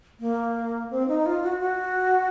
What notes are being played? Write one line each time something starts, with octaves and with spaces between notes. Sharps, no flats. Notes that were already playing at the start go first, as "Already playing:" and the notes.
A#3
C4
D#4
F4
F#4
F#4